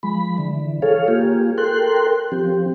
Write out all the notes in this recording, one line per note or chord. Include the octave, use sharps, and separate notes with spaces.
F3 G#3 B5
D3 E3
G#4 A4 C#5 F5
A#3 F4 G4 G#4
A4 A#4 G5 C6 F#6
F3 C4 G4